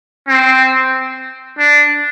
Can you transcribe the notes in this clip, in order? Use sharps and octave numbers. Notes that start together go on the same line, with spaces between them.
C4
D4